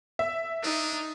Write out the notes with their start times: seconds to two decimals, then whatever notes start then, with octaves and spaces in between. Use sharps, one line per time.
0.19 E5
0.63 D4 D#4